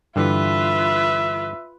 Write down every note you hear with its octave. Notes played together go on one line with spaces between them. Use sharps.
G2 D3 E3 F4 B4 E5